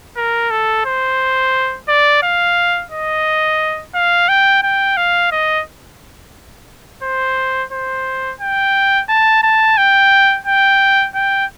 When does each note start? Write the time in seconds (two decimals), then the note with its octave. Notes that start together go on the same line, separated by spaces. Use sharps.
0.17 A#4
0.51 A4
0.85 C5
1.89 D5
2.23 F5
2.91 D#5
3.94 F5
4.29 G5
4.63 G5
4.97 F5
5.32 D#5
7.03 C5
7.72 C5
8.40 G5
9.09 A5
9.43 A5
9.77 G5
10.46 G5
11.15 G5